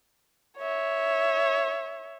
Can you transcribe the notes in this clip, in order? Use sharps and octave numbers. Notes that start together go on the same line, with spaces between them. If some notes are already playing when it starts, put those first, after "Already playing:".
C#5 E5